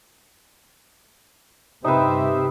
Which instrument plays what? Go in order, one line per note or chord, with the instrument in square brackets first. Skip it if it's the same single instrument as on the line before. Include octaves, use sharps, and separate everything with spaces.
[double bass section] G2 C3 [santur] D#4 B4 [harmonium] G4 C5 E5